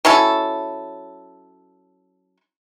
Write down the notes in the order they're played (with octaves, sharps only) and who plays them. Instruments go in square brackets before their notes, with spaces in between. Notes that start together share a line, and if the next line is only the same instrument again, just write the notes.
[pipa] F#3 C#4 E4 A4